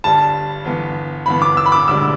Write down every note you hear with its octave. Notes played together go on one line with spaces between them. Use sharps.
G1 G2 G3 D4 A5
G1 G2 E3 B3
G1 G2 E3 B3 B5
D6
E6
B5
D6
E1 D2 D3 G3 D4 E6